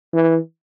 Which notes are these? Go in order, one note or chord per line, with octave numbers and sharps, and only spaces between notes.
E3